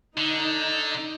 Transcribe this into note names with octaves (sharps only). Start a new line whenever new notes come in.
D3 D#4